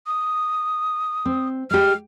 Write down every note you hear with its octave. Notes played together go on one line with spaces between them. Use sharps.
D#6
C4
G#3 G4 F6